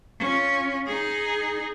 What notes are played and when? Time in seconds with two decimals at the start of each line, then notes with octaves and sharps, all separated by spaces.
0.19 C#4 F4
0.87 D#4 G#4